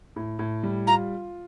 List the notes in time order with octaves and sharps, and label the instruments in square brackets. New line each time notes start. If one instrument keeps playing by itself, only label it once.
[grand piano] A2
A2
G3
[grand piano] F4 [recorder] A#5